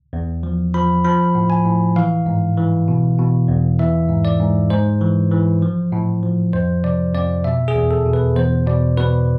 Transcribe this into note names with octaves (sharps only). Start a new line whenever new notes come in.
E2
F3
F3 B5
F3 B5
A2
G#5
A2
E3 F5
G#2
E3
B2
B2
E2
E3 E5
G#2
D5
G#2
G#2 C5
E3
E3
F3
A2
F3
F2 C5
C3 D5
F2 D5
B2 E5
G#4
E2
A4
B2
B4
E2 C5
B2 D5
B2 B4